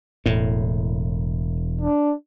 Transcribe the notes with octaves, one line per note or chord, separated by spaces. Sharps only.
E1 A2
D4